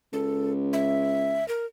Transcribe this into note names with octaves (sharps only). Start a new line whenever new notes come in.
C#2 A4
E5
A#4